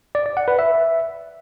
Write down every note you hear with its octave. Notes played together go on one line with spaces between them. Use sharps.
D5
D5
F#5
B4
E5